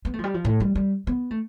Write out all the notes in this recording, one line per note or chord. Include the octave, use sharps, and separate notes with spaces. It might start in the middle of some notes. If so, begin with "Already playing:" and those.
B3
A3
F3
G3
F3
A2
G3
G3
B3
A3